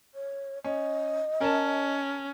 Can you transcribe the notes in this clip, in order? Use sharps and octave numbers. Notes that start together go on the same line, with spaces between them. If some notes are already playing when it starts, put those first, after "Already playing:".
C#5
C#4 D#5
C#4 A#4 A5